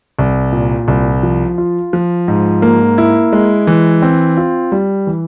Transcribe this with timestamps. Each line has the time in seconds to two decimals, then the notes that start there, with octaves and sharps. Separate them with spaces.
0.19 C2
0.52 A#2
0.88 C2
1.23 F3
1.58 F4
1.93 F3
2.28 G#2
2.62 A#3
2.98 E4
3.33 G#3
3.67 E3
4.02 C4
4.37 F4
4.72 G3
5.07 E3